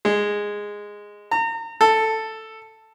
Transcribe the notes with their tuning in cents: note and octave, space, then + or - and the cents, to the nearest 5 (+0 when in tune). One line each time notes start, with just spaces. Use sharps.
G#3 -10
A#5 -35
A4 +5